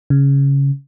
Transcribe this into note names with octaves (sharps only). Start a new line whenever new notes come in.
C#3